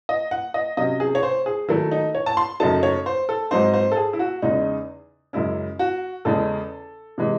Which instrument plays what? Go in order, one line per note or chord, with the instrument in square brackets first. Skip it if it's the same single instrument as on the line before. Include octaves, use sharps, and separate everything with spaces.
[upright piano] D#5
F#5
D#5
C3 F#3 C#4 D#5
G#4
C#5
C5
G#4
D#3 F#3 A3 E4
D#4
C#5
A5
C6
F#2 C#3 F#3 A3 D#4 A5
C#5
C5
A4
G#2 F#3 C4 D#4 C5
C5
A4
G#4
E4
F#4
E2 C#3 G#3 D#4
F#2 C#3 G#3 C#4 E4
F#4
E2 C#3 G#3 C#4 A4
C3 E3 G#3